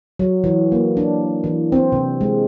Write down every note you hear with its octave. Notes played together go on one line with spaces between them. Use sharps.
F#3
E3
A#3
D4
E3
C4
C3
G#3